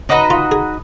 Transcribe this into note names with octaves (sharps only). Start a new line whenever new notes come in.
C#4 D#4 F#4 B4 D#5
F4
G#4